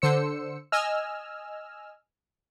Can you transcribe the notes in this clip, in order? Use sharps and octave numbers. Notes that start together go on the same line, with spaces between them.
D3 C5 E6 C#7
D#5 G#5 E6 F6